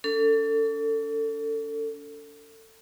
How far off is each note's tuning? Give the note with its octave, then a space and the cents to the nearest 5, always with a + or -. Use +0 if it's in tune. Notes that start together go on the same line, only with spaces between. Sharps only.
D4 -45 A4 +25